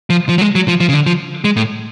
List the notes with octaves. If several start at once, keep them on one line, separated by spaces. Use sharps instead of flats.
F3
F3
F#3
G#3
F#3
F3
F3
C#3
D3
F3
G#3
A2